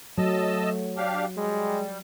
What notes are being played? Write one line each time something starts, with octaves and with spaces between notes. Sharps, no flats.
F#3 A3 D#5 A5 E6
D4 G4 F5
G3 G#3